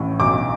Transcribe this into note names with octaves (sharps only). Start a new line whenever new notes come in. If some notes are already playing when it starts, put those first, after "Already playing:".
Already playing: A1 A2
B1 D6